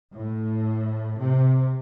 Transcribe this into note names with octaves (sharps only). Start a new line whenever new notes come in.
A2
C3